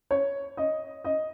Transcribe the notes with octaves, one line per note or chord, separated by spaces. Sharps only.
C#5
D#5
D#5